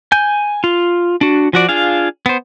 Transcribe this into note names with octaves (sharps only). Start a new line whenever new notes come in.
G#5 G6
F4
D4 F#4
F3 F#4 D5
D4 F4 G#4 F5
B3 C5